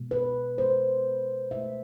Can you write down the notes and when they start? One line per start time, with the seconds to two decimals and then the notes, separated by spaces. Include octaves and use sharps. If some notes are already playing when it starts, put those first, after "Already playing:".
Already playing: B2 G#3
0.11 B4
0.58 B2 G#3 C5
1.51 B2 E5
1.55 A3